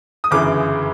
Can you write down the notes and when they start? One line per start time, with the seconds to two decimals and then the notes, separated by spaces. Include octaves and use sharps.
0.24 D#6
0.31 G1 F#2 C#3 E3 D6